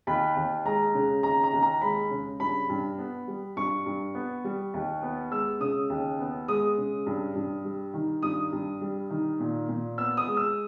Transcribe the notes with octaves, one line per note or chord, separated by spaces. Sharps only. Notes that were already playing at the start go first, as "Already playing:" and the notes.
D#2 B5
D#2
G#3 A#5
C#3
D#2 A#5
A#5
D#2
A#5
G#3 B5
C#3
G2 B5
G2
B3
G3
G2 C#6
G2
B3
G3
D#2
B3
G#3 E6
C#3 D#6
D#2
B3
G#3 D#6
C#3
G2
G2
G3
D#3
G2 D#6
G2
G3
D#3
A#2
A#2
B3 E6
D#6
G#3
E6